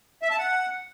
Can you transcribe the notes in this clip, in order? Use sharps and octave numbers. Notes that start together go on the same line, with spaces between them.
E5
A5
F#5